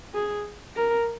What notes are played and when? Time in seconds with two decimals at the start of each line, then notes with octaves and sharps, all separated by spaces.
0.14 G#4
0.76 A#4